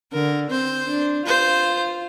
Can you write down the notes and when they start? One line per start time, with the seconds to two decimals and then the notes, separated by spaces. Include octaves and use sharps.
0.13 D3 A#4
0.50 C4 C5
0.88 D4
1.26 F4 C5